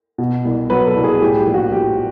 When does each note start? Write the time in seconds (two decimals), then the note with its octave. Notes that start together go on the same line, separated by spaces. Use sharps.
0.18 B2
0.45 C2
0.70 F#3 B4
0.86 A4
0.95 C2
1.04 G#4
1.21 A2 G4
1.38 G4
1.47 A#1
1.54 F#4
1.71 F3 G4